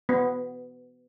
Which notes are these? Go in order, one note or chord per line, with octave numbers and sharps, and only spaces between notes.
B3